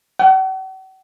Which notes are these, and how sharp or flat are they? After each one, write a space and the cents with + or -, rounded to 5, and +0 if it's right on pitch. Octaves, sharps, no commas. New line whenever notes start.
F#5 +45